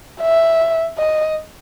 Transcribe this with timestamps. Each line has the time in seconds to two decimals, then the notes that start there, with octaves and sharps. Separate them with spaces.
0.21 E5
0.98 D#5